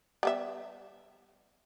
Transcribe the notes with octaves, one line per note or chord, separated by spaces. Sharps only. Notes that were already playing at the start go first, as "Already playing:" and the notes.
G3 B3 E5